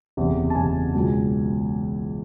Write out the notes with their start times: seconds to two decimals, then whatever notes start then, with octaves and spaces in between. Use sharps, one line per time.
0.17 F#1 E2 C3
0.50 A5
0.55 F#1 E2 C3 G#5
0.95 C#2 B2 F#3